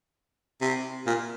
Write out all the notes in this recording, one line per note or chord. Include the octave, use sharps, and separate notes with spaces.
C3
A#2